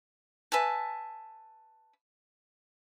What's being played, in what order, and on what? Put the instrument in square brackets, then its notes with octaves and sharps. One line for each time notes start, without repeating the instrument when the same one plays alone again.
[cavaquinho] B4 E5 G#5 A5